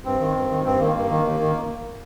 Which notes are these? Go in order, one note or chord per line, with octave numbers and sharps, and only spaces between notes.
G2 C4
D#3
G2
D#3
G2 C4
D#3 A#3
G2
D#3
D#2
D#3